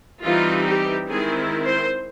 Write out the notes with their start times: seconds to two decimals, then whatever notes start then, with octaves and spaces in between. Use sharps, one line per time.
0.24 E3 G3 C4 D#4 F4
0.66 G4
1.09 D#3 G#3 C4 E4 G#4
1.66 C5